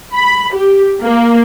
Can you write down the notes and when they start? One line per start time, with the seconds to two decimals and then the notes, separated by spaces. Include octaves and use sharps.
0.13 B5
0.53 G4
1.02 A#3